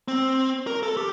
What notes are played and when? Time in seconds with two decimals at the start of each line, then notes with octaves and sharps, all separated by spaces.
0.08 C4
0.67 A#4
0.83 A4
0.97 G4